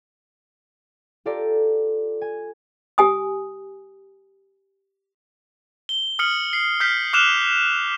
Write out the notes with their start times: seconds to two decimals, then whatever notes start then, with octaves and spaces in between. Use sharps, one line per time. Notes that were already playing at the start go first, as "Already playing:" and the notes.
1.25 F4 G4 A4 D5 A#5
2.21 G#5
2.98 G4 G#5 D#6
5.89 G7
6.19 D#6 F6 C#7 F#7
6.53 C7
6.80 F6 G6 B6 C7
7.13 D6 F6 F#6 E7 F7 G7